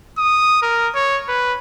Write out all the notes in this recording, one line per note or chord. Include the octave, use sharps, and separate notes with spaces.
D#6
A#4
C#5
B4